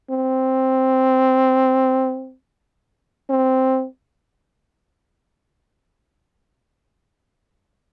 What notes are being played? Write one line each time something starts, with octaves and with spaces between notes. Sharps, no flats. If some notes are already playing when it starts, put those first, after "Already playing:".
C4
C4